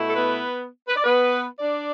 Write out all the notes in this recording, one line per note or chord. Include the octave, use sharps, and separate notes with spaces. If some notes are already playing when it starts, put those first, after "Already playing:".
Already playing: B2 A3 E4
A4
B3 B4
B4
D5
B3 B4
D4 D5